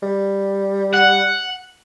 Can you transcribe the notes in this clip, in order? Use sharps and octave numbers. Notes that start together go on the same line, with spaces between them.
G3
F#5